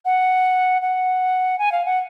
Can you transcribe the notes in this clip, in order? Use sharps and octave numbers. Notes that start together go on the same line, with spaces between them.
F#5
F#5
G#5
F5
F#5